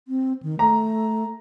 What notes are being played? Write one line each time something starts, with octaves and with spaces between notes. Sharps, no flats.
C4
D#3
A3 A#5